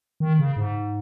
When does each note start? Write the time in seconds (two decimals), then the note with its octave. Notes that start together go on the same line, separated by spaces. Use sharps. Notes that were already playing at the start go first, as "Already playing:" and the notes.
0.20 D#3
0.39 C#3
0.57 G#2